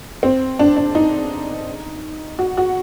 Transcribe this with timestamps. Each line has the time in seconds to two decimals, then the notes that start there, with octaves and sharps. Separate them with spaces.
0.23 C4
0.59 D4
0.77 D4
0.95 D#4
2.39 F#4
2.57 F#4